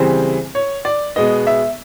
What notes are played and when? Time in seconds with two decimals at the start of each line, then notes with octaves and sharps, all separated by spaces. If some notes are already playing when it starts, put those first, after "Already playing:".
Already playing: C#3 E3 G3 C4 C5
0.55 C#5
0.85 D5
1.16 B2 G#3 B3 D#5
1.47 E5